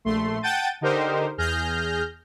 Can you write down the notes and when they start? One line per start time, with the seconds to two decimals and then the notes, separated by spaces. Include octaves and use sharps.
0.05 A#1 A3 C6
0.42 F#5 G5 A5 G6 A6 D#7
0.81 D3 D#4 G4 A#4 C5
1.38 E2 G#4 F6 G6 A#6